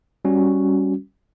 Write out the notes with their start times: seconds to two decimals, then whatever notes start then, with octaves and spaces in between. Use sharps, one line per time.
0.25 G3 C#4 F#4